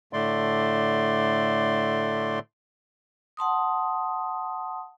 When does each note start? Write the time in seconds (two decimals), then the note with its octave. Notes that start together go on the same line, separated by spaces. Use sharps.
0.13 A2 D3 A3 D5 C6
3.37 F#5 A5 C6 D#6